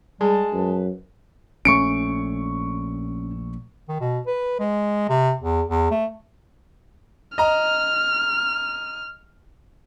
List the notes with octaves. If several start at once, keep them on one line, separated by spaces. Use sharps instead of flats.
G3 G#3 A5
F#2 B4
A#1 A3 C#4 C#6 C#7 D7
D#3
B2
B4
G#3
C3
E2
E2
A3
D#5 A#5 F6